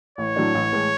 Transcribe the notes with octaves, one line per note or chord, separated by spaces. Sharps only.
A1 C#5
A2 F#3 A3 D4
A1
A2 E3 G#3